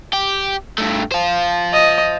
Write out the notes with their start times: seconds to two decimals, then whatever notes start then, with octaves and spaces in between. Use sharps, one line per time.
0.13 G4
0.78 G2 A3
1.12 C5 F5
1.73 D#5